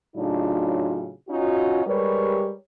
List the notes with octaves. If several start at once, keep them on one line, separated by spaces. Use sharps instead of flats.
A2 C#3 F#3 D4 D#4 F4
C#4 D#4 F4 F#4
G3 G#3 G4 A#4 B4 C#5